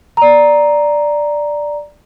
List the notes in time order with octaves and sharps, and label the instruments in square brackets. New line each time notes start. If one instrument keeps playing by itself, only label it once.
[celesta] D5 A#5